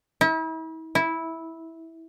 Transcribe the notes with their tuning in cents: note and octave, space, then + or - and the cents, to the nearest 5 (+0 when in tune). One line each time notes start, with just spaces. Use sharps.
E4 -40
E4 -10